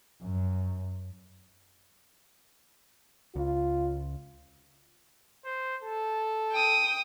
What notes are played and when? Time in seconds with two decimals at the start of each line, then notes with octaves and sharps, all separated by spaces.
0.23 F#2
3.36 C#2 F4
5.45 C5
5.83 A4
6.51 G5 D#6